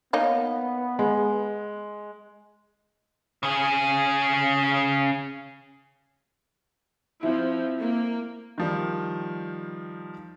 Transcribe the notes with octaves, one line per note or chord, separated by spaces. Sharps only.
A#3 B3 D#4 C#5
G#3
C#3 G#4
F3 C4 E4
A#3
D#3 F3 G3